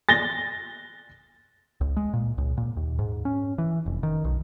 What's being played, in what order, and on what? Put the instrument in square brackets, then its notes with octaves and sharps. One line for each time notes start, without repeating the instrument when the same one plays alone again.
[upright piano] A6 A#6 G7
[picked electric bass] C#2
G#3
A#2
C#2
A#2
D#2
G#2
C#4
E3
F1
D#3
B1